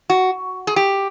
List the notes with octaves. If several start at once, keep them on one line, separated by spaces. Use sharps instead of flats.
F#4
G#4
G4